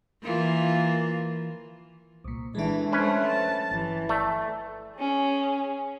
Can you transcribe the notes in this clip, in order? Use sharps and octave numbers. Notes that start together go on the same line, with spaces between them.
E3 A#3 F4
C2 A#2
E3 G#3 A3 D4
A3 C#4 B4 C5
A5
G1 E3
A3 D5
C#4 G#4